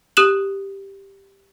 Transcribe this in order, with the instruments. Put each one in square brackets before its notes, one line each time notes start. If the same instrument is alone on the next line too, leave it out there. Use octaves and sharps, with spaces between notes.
[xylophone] G4 D#6 F#6 E7 F#7